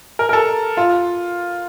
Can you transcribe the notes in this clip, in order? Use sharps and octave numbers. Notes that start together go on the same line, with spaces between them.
A#4
A#4
A4
F4